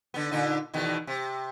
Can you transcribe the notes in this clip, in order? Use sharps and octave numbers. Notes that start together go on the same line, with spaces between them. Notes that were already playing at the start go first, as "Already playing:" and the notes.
D3 B3
A#2 D3 D#4
E2 B2 D#3
C3